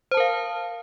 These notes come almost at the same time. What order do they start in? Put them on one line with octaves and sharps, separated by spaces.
C5 A5 A#4 F5